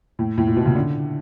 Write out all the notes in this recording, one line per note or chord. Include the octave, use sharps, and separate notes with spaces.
A2
A2
A#2
B2
C#3
D3